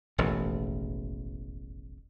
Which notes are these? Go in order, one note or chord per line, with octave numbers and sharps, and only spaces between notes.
E1 A1 D#2